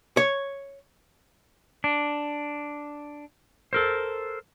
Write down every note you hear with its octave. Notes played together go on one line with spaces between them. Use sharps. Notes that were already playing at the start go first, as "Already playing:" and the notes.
C#5
D4
A4 A#4 C5